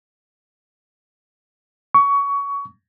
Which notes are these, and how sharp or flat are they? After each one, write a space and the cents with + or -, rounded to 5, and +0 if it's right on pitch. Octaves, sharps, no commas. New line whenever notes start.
C#6 +20